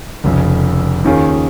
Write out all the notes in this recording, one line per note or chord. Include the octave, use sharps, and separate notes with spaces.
F1 F2 C#3
D#2 D#3 C#4 F4 G#4